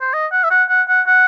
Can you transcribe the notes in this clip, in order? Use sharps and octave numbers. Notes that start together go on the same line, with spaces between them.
C5
D#5
F#5
E5
F#5
F#5
F#5
F#5